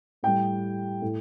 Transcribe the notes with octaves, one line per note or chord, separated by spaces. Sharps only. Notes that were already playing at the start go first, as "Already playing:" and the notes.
A2 G3 G5
A2